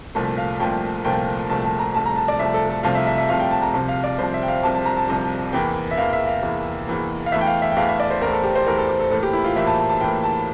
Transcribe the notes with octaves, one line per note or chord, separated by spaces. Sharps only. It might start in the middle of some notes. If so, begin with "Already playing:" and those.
C2 A#2 F3 A3
F5
C2 A#2 F3 A3 G5
C2 A#2 F3 A3 G5
C2 A#2 F3 A3 A5
A5
A#5
C2 C3 F3 A3 A5
A#5
A5
D5
C2 C3 F3 A3 E5
A4
A4
C2 C3 F3 A3 F5
E5
E5
E5
C2 C3 F3 A3 F5
G5
A5
A#5
C2 C3 F3 A5
F5
D5
C2 C3 F3 C5
E5
G5
F5
C2 C3 F3 A5
A5
A#5
A5
C2 C3 F3
E2 E3 A#3 G5
E5
E2 E3 A#3 F5
E5
F5
E2 E3 A#3
E2 E3 A#3
F5
E2 E3 A3 E5
G5
F5
E5
G5
E2 E3 A3 F5
E5
D5
C5
E2 E3 A3 A#4
A4
G4
C5
E2 E3 A3 A#4
A4
G4
A4
A2 E3 A#3 A4
G4
E4
F4
A2 E3 A#3 E5
A5
A5
A5
A2 E3 A#3 G5
A5